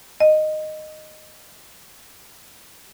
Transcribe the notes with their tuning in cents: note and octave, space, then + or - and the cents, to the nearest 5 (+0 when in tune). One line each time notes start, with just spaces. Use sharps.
D#5 -10